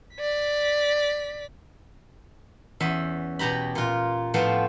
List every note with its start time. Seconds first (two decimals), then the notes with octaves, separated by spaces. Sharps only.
0.16 D5 B6
2.80 E2 C#4 E5 B5
3.39 B2 G4 A#5 B5
3.75 A#2 F4
4.34 A2 F3 B3 C4 F4